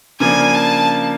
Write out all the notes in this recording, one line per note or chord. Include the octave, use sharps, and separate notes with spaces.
C#3 F3 A#3 D4 G#5
A5